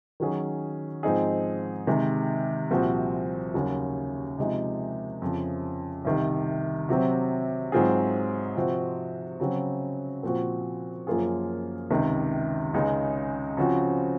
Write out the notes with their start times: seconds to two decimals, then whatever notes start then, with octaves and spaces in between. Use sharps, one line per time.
0.20 D#3 F#3 C#4 G#4
1.03 G#2 F3 C4 D#4 G#4
1.87 C3 D#3 G#3
2.71 C2 A#2 F3 C4 F#4
3.54 D#2 C#3 F#3
4.38 C3 F3 G#3 D#4
5.22 F2 C#3 F3
6.05 C2 C3 D#3
6.89 C3 F#3 C4
7.72 G#2 F#3 C4 F4 G#4
8.56 C3 F3 C4 F#4
9.40 C#3 F#3 C4
10.23 A#2 F3 C4 F#4
11.07 F#2 F3 A#3 F4 G#4
11.90 C#2 C3 D#3
12.74 C#2 C#3 G#3 D#4
13.57 C#3 F3 C4 F#4